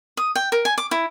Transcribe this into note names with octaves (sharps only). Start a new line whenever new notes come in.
D#6
G5
A#4
G#5
D6
E4